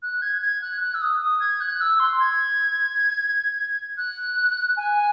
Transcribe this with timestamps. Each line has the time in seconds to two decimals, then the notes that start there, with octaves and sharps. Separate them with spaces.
0.03 F#6
0.22 G#6
0.42 G#6
0.62 F#6
0.81 F#6
0.94 E6
1.01 D#6
1.21 D#6
1.40 G#6
1.61 F#6
1.81 E6
2.00 C6
2.20 G#6
3.98 F#6
4.77 G#5